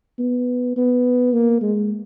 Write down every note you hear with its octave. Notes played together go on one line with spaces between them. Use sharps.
B3
B3
A#3
G#3